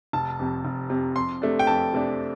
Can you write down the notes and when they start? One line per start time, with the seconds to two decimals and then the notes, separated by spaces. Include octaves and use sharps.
0.13 F1 A5
0.39 F2 C3
0.65 F1
0.90 F2 C3
1.16 F2 C6
1.42 C3 A3 D4
1.59 G5
1.67 F2 A5
1.94 C3 A3 D4